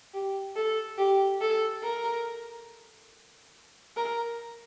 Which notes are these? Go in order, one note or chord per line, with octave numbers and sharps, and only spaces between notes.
G4
A4
G4
A4
A#4
A#4